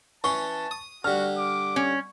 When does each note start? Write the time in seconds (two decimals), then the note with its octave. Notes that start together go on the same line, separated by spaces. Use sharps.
0.24 E3 C#4 A5 C6 C#6
0.71 D#6
1.04 D3 G3 F#4 F6
1.38 D6
1.76 C#4